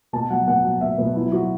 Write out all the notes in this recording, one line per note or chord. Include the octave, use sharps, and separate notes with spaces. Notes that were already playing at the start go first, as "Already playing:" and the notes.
B2 A5
F#3 F#5
B2 F#5
F#3 F#5
B2 E5
B2 B4
F#3 E4
F#3 F#4